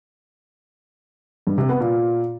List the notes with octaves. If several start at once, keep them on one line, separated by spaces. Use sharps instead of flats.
G2
C3
B3
A#2